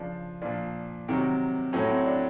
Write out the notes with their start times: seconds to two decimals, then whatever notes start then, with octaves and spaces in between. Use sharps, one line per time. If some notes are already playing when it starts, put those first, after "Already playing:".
Already playing: C#3 F3 D4
0.42 A#2 F3 D4
1.08 C3 D#3 F#3
1.73 A2 F#3 C#4
1.90 C4
2.06 D4